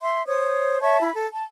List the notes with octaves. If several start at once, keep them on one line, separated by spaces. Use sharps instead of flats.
E5 C6
C5 C#5 D#6
C#5 E5 A5 C#6
E4 B5
A4
A5